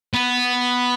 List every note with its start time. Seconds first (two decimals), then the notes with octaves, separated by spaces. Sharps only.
0.14 B3